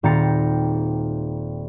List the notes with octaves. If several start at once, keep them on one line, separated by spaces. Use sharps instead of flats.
D#1 C4 G4 A#5 A6 C#7